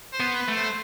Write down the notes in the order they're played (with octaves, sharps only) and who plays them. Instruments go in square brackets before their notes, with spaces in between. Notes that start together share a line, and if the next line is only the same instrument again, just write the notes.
[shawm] C5
[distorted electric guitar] B3
[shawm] B4
[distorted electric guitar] A3
[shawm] C5